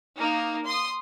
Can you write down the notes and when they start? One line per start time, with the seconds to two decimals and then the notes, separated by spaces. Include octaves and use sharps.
0.18 A#3 D#4
0.66 C6 D#6